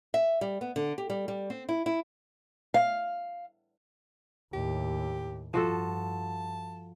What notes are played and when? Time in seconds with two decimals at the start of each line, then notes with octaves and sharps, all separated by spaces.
0.14 E5
0.41 G3
0.61 B3
0.76 D3
0.98 G4
1.10 G3
1.28 G3
1.50 C4
1.69 E4
1.86 E4
2.74 F5
4.53 D#2 A2 G4
5.54 G2 F3 F#4 A4 A5